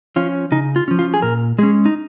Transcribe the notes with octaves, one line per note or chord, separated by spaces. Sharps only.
F3 C#4 F4
C#3 D#4
F4
F3 C#4
F4
G#4
A#2 A#4
G#3 C#4 G#4
D#4